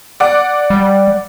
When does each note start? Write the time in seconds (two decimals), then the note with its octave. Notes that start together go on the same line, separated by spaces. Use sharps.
0.20 D5 F#5
0.70 G3